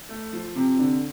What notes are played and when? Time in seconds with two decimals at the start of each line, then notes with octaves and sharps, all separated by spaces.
0.09 A3
0.33 F3
0.56 C3
0.79 D3